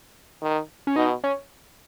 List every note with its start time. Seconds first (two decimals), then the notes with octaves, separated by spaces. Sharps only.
0.42 D#3
0.87 C#4
0.96 B2 D#4
1.24 C#4